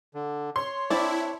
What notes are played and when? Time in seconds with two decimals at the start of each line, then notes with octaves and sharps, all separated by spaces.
0.14 D3
0.56 C#5 C6
0.90 C4 D4 E4 D5